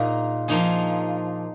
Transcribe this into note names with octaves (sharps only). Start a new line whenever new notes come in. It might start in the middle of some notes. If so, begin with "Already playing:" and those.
Already playing: A#2 A#3 D#4 G#4
F3 A#3 D#4 G#4